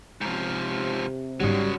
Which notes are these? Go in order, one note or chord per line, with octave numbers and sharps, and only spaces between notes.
G#2 C3 F3
G1 G#2 C#3 F#3 G3